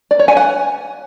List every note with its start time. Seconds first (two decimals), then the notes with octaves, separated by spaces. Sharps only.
0.11 D5
0.19 C#5
0.28 G#5
0.37 F#5